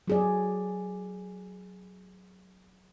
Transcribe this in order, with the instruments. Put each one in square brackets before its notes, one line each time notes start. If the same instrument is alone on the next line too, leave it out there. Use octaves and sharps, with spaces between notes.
[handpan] F#3 G#4 D5